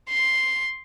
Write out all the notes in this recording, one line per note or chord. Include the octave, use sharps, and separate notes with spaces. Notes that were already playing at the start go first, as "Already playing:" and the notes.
C6